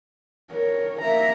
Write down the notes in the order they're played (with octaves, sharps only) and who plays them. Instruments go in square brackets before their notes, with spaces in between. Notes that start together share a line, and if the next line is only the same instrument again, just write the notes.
[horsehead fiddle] A#4 C#5
[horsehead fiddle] A#3 A#5 [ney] E5